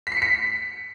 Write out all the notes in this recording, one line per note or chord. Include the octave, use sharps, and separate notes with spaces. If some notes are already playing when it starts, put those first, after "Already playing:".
B6
C7
C#7
B6